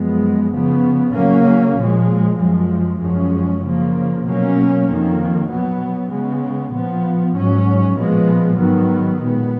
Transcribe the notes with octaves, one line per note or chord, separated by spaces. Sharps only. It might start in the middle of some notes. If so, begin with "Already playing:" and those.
Already playing: F#2 F3 G#3 B3
C#3 F3 B3
C#3 F#3 A#3 C#4
A#2 F3 G#3
F#2 F3 G#3
F#2 F3 G#3 C#4
C#3 F3 A#3
B2 F#3 A#3 C#4
F2 D#3 A#3
B2 F#3 B3
C#3 G#3 B3
A#2 F3 B3
G#2 F#3 C#4
A#2 F3 G#3 B3
G#2 D#3 F#3 B3
A#2 G#3 B3